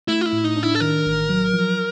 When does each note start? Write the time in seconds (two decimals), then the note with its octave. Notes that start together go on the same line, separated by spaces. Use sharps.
0.08 A3 E4
0.21 F4
0.26 E4
0.32 A2
0.44 D#4
0.56 D4
0.63 E4
0.75 A4
0.80 D#3 A#4
1.05 A1
1.29 F#3
1.53 F3